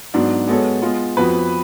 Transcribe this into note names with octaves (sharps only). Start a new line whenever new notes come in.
G#2 F#3 B3 D4
G#3 B3 F#4 A4 C#5
G#3 B3 F4
F2 F3 B3 F#4 B4